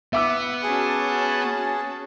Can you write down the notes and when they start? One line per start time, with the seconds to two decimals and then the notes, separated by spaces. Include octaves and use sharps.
0.13 B3 E5 D6 E6
0.63 C#4 F#4 G#4 A5